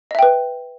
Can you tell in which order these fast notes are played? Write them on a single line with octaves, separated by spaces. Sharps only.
D#5 E5 G5 B4